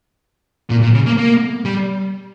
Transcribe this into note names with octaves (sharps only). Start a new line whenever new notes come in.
A#2
A#2
C#3
A#3
A#3
G3